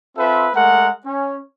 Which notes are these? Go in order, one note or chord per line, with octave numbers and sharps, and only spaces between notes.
C4 F4 A4 B4 E5
G#3 A3 A#4 F#5
C#4